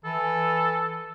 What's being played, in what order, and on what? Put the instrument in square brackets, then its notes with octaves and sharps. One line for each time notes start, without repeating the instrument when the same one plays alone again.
[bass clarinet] E3 [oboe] A4